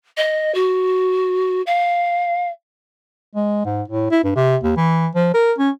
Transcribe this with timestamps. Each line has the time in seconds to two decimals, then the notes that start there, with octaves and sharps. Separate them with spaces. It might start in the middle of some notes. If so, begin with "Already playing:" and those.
0.17 D#5
0.54 F#4
1.66 F5
3.34 G#3
3.65 G#2
3.88 A2
4.11 E4
4.24 G2
4.35 C3
4.63 D#2
4.77 E3
5.15 F3
5.34 A#4
5.58 C#4